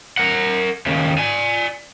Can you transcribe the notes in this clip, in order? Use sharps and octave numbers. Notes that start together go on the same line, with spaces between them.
A#4 F#5
D#2 C#3
D5 G#5